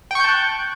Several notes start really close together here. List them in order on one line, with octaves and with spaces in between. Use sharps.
G5 C#6 G6 A5 F#6